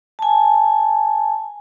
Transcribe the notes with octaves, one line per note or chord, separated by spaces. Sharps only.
G#5 A5